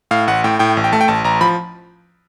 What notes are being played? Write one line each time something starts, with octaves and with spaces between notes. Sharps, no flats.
A2 F5
A1 F#5
A2 G5
A2 G5
A1
G5
A3 A5
G5
A1 A5
A1 A#5
F3 B5